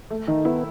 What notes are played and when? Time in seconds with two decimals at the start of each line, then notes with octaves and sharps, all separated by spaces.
0.10 A3
0.28 D#3 D#4
0.45 B3 E4